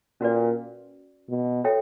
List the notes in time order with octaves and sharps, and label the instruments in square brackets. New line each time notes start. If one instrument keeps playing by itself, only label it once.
[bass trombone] A#2 [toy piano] C#4 F#4 B4 D5
[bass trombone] B2
[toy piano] F#4 A4 C#5 E5 G5